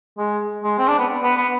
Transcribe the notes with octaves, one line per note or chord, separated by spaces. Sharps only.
G#3
G#3
C4
D4
B3
B3
B3